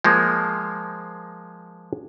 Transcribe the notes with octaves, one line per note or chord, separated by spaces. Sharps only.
F3 G#3 A#3